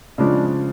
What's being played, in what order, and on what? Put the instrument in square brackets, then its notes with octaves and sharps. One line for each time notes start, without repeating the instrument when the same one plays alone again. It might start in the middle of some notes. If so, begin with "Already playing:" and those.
[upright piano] C#3 F3 G#3 [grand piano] D4